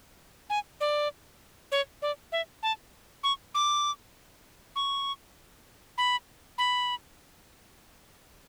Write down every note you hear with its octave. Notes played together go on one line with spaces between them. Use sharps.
G#5
D5
C#5
D5
E5
A5
C#6
D6
C#6
B5
B5